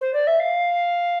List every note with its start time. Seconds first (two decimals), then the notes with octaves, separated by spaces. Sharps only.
0.01 C5
0.13 D5
0.27 E5
0.40 F5